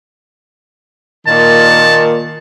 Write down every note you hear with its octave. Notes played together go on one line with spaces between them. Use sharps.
A#2 D#3 A5